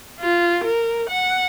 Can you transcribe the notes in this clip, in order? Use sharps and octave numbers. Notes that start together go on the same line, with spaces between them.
F4
A#4
F#5